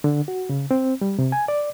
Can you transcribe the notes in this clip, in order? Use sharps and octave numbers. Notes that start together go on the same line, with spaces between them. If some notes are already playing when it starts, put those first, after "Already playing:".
D3
F#4
C#3
C4
G3
C3
G#5
D5